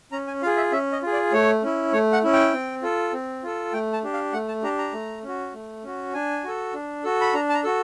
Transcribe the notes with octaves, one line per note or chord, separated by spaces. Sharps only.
C#4 A#5
G#5
F4 G#4 F5
E5
C#4 E5
D#5
F4 G#4
D5
A3 C#5
C#4 E4
A3 C#5
F#5
C#4 E4
G5
C4
F4 A4
C4
F4 A4
A3 G5
A5
D4 G4
F5
A3 F#5
A5
D4 G4 A#5
A#5
A3
C#4 F#4
A3
C#4 F#4
D4 G#5
F#4 A4
D4
F#4 A4
B5
D4 A#5
A5
A#5
F#4 A4